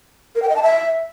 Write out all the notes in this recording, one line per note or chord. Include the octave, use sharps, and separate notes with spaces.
A#4
G5
D#5
A5
E5